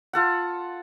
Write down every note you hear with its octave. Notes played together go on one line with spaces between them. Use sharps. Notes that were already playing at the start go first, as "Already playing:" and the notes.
F4 A4 F#5